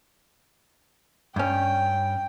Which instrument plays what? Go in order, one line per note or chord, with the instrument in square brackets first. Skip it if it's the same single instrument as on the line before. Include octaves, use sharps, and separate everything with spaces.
[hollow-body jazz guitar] G2 C#4 [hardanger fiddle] G5